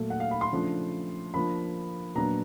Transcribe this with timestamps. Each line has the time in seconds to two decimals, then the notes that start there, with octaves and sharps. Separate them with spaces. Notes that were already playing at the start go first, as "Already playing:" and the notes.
Already playing: A#2 F#3 A3
0.10 F#5
0.20 F5
0.31 B5
0.41 C6
0.51 C#3 F3 A3 D4
1.34 F3 A#3 D4 B5
2.15 A#2 F#3 B3 D4 A#5